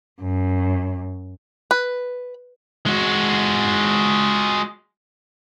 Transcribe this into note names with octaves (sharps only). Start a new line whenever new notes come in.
F#2
B4
G#3 F#4